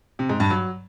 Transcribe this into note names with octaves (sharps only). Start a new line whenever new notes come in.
C3
G#2
G2
F#3